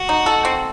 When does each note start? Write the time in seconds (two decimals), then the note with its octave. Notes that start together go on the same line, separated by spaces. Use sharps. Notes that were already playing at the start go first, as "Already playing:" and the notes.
Already playing: F#4
0.09 D#4
0.26 A4
0.45 C4